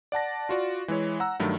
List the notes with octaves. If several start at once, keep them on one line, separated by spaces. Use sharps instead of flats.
D5 F#5 A5 A#6
F4 F#4 D5
E3 G#3 E4 C#5
F#5 A#5 E6
G2 D#3 F#3 A3